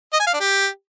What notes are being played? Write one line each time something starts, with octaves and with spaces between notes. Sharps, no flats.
D#5
G#5
F5
D4
G4